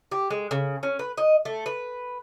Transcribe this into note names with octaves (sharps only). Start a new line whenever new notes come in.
G4
G#3
C#3
C#4
B4
D#5
A3
B4